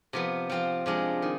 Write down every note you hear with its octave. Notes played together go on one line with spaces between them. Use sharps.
C3 F3 B3
F3 C4 F4
C3 F3 G#3 D4 F4
D#3